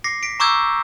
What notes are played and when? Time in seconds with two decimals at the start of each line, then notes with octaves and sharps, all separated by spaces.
0.04 D6 A#6 C7 C#7
0.23 B6 D7
0.40 A#5 C#6 D6 E6 G6 G#6